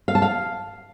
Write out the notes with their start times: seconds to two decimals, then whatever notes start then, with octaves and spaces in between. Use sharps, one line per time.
0.08 F5
0.15 A5
0.22 F5